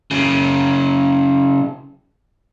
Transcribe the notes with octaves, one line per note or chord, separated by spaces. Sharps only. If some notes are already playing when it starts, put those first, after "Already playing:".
C#3 F#3